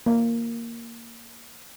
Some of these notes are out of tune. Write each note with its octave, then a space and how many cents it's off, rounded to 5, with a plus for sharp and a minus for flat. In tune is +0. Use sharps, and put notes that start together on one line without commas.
A#3 -5